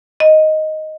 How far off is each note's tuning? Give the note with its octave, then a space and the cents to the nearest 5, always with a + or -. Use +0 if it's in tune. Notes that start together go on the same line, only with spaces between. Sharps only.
D#5 +5